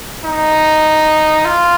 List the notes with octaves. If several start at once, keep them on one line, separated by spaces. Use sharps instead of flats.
D#4
F4